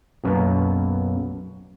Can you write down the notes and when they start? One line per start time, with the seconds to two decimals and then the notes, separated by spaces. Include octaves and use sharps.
0.24 B1 F#2 B2 A#3 B3